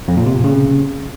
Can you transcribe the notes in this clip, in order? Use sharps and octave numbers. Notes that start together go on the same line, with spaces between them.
F2
A#2
C3
A#2
C#3